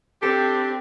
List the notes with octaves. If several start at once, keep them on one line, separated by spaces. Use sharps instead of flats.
C4 D4 G4 A4